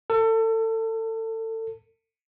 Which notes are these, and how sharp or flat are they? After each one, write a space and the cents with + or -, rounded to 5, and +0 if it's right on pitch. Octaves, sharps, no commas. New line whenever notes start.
A4 +30